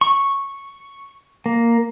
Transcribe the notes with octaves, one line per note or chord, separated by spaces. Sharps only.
C#6
A#3